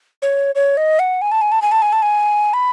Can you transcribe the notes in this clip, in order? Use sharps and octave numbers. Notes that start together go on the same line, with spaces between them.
C#5
C#5
D#5
F#5
G#5
A5
G#5
A5
G#5
A5
G#5
A5
G#5
B5